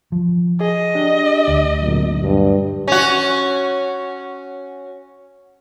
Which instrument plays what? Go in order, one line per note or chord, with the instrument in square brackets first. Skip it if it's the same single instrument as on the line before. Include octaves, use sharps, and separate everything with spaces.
[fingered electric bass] F3
[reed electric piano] G#4 [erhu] D#5
[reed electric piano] D4 G4
[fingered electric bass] D2
[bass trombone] G#1 [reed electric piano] A#2 D3 F#3
[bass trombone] G2
[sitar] C#4 F#4